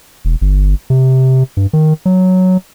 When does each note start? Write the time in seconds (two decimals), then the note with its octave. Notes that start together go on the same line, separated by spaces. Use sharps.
0.25 E1
0.41 G1
0.90 C3
1.57 G2
1.73 D#3
2.05 F#3